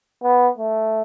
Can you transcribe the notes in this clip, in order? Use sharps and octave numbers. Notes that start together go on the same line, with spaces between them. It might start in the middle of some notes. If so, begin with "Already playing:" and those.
B3
A3